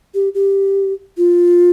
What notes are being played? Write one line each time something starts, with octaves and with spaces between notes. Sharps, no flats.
G4
G4
F4